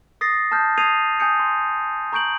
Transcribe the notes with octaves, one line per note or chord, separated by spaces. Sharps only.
D#6 A6 A#6 C7
A5 D#6 F6 G6
D#6 G#6 C7 D#7 F7
G#5 D#6 G6 C#7
C6
A#5 C#6 G6 D7 F#7